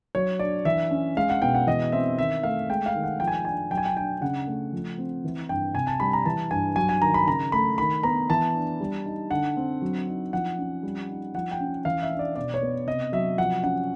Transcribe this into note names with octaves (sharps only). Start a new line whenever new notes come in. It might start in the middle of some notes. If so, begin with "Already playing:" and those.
F#3 C#5
D4 D5
E3 E5
C#4
G#3 F5
F#5
B2 G5
F#5
E3 D#5
C4 E5
D#3 E5
A3 F5
G#3 G5
F5
D#3
F#5
F3 G5
G#5
G5
D4 G#5
F#3 G5
G#5
G5
D4 G5
C#3 F#5
A3
F3
C4
E3
G2 G5
C3 G#5
A5
G3 B5
A#5
E3 A5
G2 G#5
F#3 G#5
G#5
D#3 A#5
B5
C#3 A#5
A3 B5
D#3 B5
B3 A#5
E3 A5
D4
G3
D#4
D3 F#5
C4
F#3
D#4
F3 F#5
C#4
G3
D#4
F3 F#5
G5
C#4
E3 F5
E5
D4
D5
B2 D5
C#5
B3
C3 D#5
F#3 E5
F3 F#5
C#4 F#5